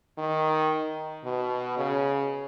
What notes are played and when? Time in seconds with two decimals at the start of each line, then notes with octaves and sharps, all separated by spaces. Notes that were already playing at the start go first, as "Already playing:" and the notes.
0.18 D#3
1.25 B2
1.77 C#3